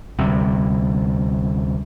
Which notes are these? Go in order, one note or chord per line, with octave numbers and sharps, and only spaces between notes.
D2 C3 G3